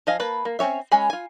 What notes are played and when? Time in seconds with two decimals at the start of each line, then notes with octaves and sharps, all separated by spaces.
0.07 F3 D#5 F5 G#5
0.20 A#3 B4 A5 B5
0.45 A#3
0.59 C4 C#4 G#4 C#5 E5
0.92 G#3 C#4 G#4 G#5 B5
1.10 F4 G#5